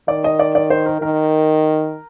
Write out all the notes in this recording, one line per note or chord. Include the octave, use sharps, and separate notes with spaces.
D#3 D5
D#5
D5
D5
C5
A#4
D#3 A#4